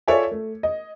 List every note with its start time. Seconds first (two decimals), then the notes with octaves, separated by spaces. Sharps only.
0.08 F4 A4 C#5 D5 E5 G#5
0.31 A3
0.63 D#5